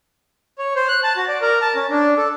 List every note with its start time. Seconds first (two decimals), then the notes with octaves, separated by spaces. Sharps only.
0.59 C#5
0.76 C5
0.88 F#6
1.04 A5
1.17 F#4
1.28 D5
1.42 A#4
1.62 A5
1.75 C#4
1.90 D4
2.17 A4